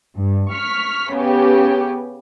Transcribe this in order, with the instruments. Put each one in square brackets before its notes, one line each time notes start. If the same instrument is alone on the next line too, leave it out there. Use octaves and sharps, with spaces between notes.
[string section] G2
C#6 F6 B6
C#3 B3 G4